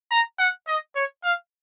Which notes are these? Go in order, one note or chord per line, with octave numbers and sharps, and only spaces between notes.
A#5
F#5
D#5
C#5
F5